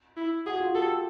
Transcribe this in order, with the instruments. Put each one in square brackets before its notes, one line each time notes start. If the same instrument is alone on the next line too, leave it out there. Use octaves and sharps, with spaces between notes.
[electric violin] E4
[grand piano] F#4 [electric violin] G#4
[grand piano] F4
[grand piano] G4 [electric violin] A4